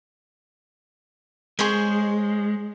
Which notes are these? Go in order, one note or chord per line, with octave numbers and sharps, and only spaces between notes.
G#3 G#4 C5 C#5